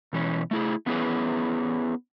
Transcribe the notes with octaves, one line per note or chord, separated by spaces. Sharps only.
B2 E3 C#4
A3 E4 G#4
A3 B3 C#4 E4 G#4 B4